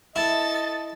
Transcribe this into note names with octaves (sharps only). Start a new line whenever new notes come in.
E4 A4 D#5 A6